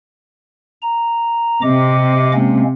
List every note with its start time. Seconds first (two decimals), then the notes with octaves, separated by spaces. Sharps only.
0.82 A#5
1.62 C3 D#5 D6
2.34 G#3 A#3 C#4